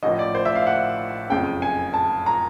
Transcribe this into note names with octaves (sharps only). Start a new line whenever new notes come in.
A1 A2 F3 D#5
D5
C5
E5
F5
F#5
F#1 F2 C#3 G5
G#5
A5
A#5